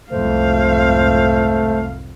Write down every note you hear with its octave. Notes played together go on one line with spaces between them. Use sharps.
C2 F2 G#2 A3 C5 F5